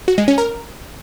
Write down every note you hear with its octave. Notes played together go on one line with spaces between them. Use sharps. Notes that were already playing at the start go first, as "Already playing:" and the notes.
F#4
G#3
C#4
A#4